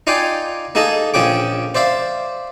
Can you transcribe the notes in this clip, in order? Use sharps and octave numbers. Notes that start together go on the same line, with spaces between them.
D#4 F4 D5 F5 G5 G#5
A#3 D#4 G#4 A4 D#5
A#1 F3 C#4 G#4 G5 D6
C5 D5 E5 F5